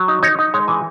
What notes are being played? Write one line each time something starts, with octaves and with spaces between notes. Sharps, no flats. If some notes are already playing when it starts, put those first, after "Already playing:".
Already playing: F#3
D#4
D#4 C#5
D#4
G#3 C#5
E3 G#5